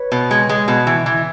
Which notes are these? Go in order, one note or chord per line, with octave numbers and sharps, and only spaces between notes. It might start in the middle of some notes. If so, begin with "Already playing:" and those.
Already playing: B4 C#5
B2
G#3
G#3
B2
E3
E3